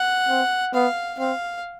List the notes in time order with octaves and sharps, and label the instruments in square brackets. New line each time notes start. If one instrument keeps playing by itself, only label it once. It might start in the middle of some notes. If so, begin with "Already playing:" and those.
Already playing: [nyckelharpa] F#5
[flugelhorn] C4
[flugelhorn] B3 [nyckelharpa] F5
[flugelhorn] C4 [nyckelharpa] F5